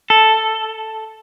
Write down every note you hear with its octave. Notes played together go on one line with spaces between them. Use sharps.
A4